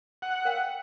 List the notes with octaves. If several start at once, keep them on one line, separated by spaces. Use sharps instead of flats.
F#5
A#4 F5 G5